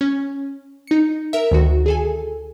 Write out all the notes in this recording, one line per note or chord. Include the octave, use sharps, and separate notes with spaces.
C#4
D#4 C#7
A#4 E5
D2 D#3 F#4
G#4 A4 G#5